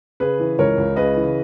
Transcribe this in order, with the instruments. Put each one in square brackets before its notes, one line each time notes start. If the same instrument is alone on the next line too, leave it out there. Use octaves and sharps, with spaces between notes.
[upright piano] C#3 G#4 B4
E3
C#2 A#4 C#5
C#2
C#3 B4 D#5
E3